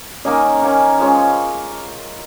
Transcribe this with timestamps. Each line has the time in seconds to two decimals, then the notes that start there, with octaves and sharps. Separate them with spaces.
0.25 D#3 A#3 C#4 D#5
0.62 D#3 A#3 C#4
0.99 F3 G#3 C#4